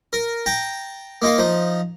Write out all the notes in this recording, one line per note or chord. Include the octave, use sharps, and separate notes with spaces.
A#4
G5 A5 A#5
A#3 D#4 F4 F5
F3 D#4